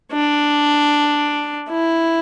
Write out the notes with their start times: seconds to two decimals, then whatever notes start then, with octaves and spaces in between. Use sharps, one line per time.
0.12 D4
1.70 E4